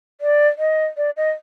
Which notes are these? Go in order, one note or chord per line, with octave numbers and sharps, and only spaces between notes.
D5
D#5
D5
D#5